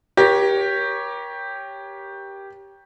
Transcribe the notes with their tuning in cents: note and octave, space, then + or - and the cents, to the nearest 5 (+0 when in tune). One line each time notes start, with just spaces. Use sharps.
G4 +0 A#4 +35 C#5 +0